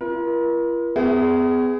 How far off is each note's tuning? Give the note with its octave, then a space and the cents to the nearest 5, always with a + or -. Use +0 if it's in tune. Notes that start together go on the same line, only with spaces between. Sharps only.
F4 -45 A#4 +40
B3 +40 G#4 +0 E5 -15